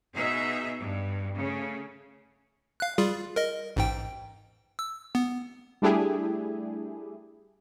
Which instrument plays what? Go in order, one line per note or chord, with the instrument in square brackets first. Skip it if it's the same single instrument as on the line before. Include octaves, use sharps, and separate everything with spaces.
[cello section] B2 D#4 G#4 D#5 E5
G2
C#3 A3
[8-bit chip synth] F5 F#6
G3 F4 G#4
A#4 D#5
A1 G#2 G5
E6
B3
[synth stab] G3 A3 D4 E4 G4 G#4